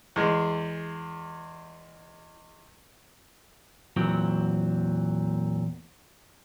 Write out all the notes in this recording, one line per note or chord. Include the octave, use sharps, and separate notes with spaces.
E2 G#3
E2 A#2 F#3 C4